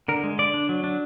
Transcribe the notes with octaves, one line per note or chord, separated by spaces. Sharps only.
D3 A#4
G#3
D3 D5
D4
F#3
D4